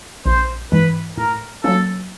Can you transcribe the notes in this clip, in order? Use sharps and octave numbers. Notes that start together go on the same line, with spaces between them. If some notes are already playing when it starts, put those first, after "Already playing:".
A#1 C5
G#2 E3 G#3 B4
A2 A#4
F#3 A#3 C#4 A4